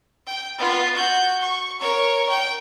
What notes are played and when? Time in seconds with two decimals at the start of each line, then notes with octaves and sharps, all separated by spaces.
0.26 G5
0.58 B3 F4
0.94 F#4 G6
1.41 C#6
1.79 A#4 C#5
2.29 G5